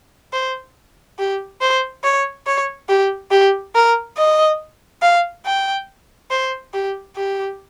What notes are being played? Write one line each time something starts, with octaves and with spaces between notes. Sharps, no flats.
C5
G4
C5
C#5
C#5
G4
G4
A#4
D#5
F5
G5
C5
G4
G4